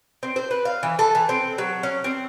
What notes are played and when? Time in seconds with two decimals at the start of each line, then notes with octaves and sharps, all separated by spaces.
0.23 C4
0.36 C5
0.51 B4
0.65 F5
0.83 E3
0.99 A4
1.15 E3
1.29 C4
1.58 F#3
1.83 C#4
2.04 C4